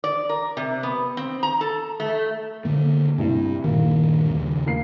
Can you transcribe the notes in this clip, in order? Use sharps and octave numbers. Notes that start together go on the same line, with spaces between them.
D5
A#4
C3
B3
C4
A#5
A4
A3
D3 A#3
C2 G2
G2 A#2 D#3 A#3
D#2 C#3
A#3 C7